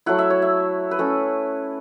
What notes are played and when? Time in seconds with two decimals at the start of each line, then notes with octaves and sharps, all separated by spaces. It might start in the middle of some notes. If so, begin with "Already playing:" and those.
0.06 F#3 A3 E4 F#5
0.19 E5
0.30 C#5
0.42 E5
0.91 B4
0.99 A3 C#4 E4 A4